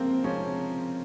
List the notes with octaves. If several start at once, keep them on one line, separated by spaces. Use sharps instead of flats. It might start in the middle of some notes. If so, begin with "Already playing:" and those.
Already playing: C3 F3 G#3 A#3 C4
C3 F3 G#3 C#4